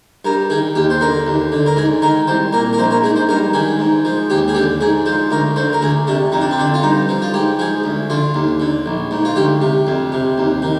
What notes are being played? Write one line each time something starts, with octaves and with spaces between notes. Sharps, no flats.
G2 A#4
D#3 G#4
D#2 G4
C5
D3 A#4
D#2
D3
A#4
G#2 G#4
D#3 A#4
C2 C5
A#2 A#4
A#4
A#1 C5
A#4
G#2 G#4
C5
G2 A#4
D#3 G#4
G#2
F3
D#2 G4
G#4
D3 G4
G#2 G#4
F3 C5
D2 A#4
D3 C5
A#4
D2 G#4
C3 D4
F2 D#4
D4
C4
D3 D4
F4
G2 D#4
F3
F4
G#2 G4
F3 G#4
D2
D3 F4
D#2
D3
A#1
G#2
F4
D2 G4
C3
F2
C3
D#2
D#3